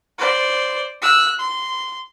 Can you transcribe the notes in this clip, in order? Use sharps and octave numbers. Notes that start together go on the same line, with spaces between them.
C5 D5
E6 F#6
C6